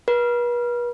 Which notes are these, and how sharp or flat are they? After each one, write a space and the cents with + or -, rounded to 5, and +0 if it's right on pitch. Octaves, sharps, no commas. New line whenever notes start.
B4 -40